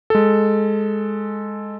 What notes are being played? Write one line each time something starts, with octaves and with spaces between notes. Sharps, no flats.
G#3 A4